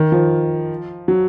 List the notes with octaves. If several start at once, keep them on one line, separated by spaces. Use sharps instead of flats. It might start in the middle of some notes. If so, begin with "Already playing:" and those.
Already playing: D#3
F3
F#3